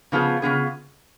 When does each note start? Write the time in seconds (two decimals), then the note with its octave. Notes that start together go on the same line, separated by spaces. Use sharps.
0.12 C#3 F3 B3 F4 G#4
0.42 C#3 F3 B3 F4 G#4